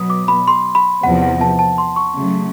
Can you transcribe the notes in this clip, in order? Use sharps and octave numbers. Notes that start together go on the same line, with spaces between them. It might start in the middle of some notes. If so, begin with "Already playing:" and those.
Already playing: B2 F#3 B3 D#6
D6
B5
C6
B5
E2 C3 F3 F#5
F#5
A5
A5
C6
C#6
C#3 F#3 A3